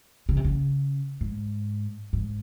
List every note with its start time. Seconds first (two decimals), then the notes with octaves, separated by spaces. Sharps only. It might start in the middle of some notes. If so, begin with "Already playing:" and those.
0.29 C#3
0.36 C3
0.44 C#3
1.21 G#2
2.13 G#2